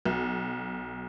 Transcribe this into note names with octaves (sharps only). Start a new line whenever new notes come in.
B1